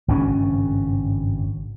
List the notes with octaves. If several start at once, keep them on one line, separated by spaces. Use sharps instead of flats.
G#1 G2 C#3 C#4